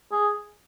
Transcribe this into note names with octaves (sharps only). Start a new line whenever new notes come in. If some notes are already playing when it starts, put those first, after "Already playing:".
G#4